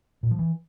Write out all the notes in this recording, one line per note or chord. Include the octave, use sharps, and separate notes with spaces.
A#2
F3
E3